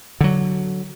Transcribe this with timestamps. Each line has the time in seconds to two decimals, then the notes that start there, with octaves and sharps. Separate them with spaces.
0.21 D3 F#3